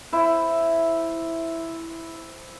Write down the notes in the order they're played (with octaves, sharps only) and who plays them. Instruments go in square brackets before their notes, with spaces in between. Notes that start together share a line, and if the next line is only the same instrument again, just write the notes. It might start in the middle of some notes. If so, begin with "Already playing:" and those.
[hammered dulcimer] E4 C5